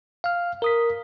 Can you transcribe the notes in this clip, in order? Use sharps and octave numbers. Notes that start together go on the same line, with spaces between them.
F5 F6
A#4 D#6 B6